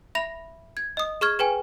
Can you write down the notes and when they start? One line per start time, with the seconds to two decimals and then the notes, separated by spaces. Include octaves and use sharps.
0.15 E5 B5 A#6 F7
0.77 G#6
0.97 D#5 D#6
1.21 G#4 C#6 F6 G#6
1.39 G#4 B4 G5 G#5